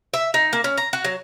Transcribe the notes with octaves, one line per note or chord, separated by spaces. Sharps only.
E5
D#4
A#3
C#4
A#5
F#4
F#3